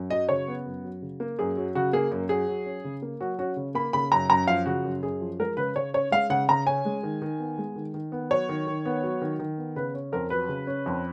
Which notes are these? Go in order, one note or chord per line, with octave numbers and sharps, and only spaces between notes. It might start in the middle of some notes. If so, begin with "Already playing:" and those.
Already playing: F#2
F#3 D#5
C#3 C#5
B3
F#2
F#3
C#3
A#3
F#2 G#4
F#3
C#3 F#4
A#3 G#4
F#2
F#3 G#4
F#3
C#4
C#3
A#3
F#3 F#4
C#4 F#4
C#3
A#3 B5
C#3 B5
F#2 A#5
F#2 A#5
F3 F5
C#3 F#4
F#2
F#2 G#4
F3
G#3 A#4
C#3 B4
C#3 C#5
C#4 C#5
G#3 F5
C#3 F#5
C#3 A#5
C#4 G#5
G#3
D#3
D#3
B3
G#3
D#3
D#3
B3
F#3 C#5
D#3
D#3
B3
F#3
D#3
D#3
B3
C#3 B4
C#4
F2 A#4
F#3 B4
C#3
C#4
F2